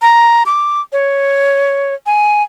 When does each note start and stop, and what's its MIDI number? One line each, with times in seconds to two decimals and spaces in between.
0.02 0.43 82
0.46 0.81 86
0.92 1.94 73
2.06 2.43 80